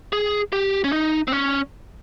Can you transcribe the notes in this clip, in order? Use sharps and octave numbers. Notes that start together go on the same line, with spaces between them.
G#4
G4
C#4
D#4
C4
C#4